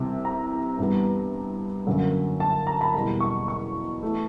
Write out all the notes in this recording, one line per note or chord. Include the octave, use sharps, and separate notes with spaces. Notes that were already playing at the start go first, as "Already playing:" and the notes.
Already playing: C2 C3 E3
A#5
G2 E3 G3 B3
F#2 D3 F#3 A#3
A5
A#5
B5
E2 B2 G3 A#3 B5
C#6
C#6
E3 A3